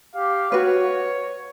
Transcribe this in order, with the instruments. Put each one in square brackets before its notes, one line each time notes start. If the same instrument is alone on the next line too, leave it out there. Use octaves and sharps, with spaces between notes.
[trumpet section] G4 F5
[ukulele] F#4 B4 [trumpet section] C#5